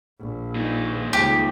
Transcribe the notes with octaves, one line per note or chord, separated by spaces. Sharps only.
A#1
A#2 D#4
C#2 G4